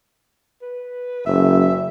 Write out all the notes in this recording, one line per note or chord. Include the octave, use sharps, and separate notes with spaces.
B4
F#1 E5